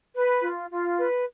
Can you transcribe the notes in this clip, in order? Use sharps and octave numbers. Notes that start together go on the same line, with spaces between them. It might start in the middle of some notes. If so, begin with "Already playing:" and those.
B4
F4
F4
B4